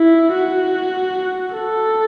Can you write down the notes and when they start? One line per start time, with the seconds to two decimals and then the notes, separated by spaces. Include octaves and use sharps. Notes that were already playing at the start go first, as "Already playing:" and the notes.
Already playing: E4
0.33 F#4
1.55 A4